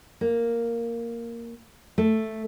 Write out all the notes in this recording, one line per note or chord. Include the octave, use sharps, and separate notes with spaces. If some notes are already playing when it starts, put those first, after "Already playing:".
A#3
A3